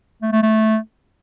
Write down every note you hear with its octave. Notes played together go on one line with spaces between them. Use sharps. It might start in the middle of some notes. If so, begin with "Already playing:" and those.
A3
A3
A3